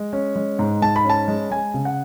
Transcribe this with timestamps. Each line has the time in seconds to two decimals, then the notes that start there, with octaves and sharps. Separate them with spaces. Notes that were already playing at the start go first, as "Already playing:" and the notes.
Already playing: G#3
0.13 C#4
0.36 G#3
0.59 G#2
0.82 G#2 A5
0.96 B5
1.05 C#4 A5
1.28 G#3
1.51 G#3 G#5
1.74 C#3
1.85 F#5